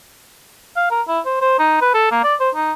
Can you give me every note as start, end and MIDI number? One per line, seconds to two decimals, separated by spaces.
0.76 0.87 77
0.90 1.02 70
1.08 1.20 64
1.26 1.36 72
1.41 1.58 72
1.59 1.78 63
1.81 1.91 71
1.94 2.07 69
2.11 2.21 58
2.23 2.35 74
2.40 2.50 72
2.55 2.73 63